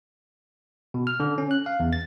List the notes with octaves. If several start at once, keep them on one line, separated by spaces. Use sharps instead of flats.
B2
F6
D3
C#4
F#6
F5
E2
A6